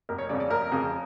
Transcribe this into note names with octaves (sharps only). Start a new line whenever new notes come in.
F1 A#4
C#5
F2 C#3 D5
D5
F1 A#4
F2 C#3